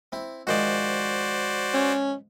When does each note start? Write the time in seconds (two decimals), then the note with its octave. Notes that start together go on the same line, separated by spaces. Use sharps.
0.12 C4 E4
0.47 G#2 D#3 F3 F#4 C5 D5
1.74 C#4